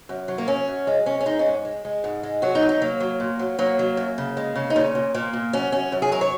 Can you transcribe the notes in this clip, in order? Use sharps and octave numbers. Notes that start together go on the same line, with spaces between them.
F#2
F#3
A#3
F#3 C#4
F#2
G#3
G#3 C#4
C#4
G#3 D#4
C#4
G#2
G#3
G#3
G#2
G#3
F#3 F#4
D#4
F#3
D#4
F#3 A#3
F#3
A#2
F#3
F#3 A#3
F#3
F#2
C#3
G#3
C#3
D#4
A#2 C#4
A#2
A#2 A#3
A#2
F#2 C#4
F#2 C#4
F#2
G#4
F#3 A#4
C#5